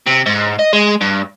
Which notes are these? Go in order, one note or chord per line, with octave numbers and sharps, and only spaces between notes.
C3
G#2
D#5
G#3
G2